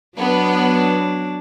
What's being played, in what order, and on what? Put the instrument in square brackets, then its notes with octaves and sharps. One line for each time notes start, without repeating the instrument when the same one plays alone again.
[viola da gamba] F#3 D4 [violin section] B3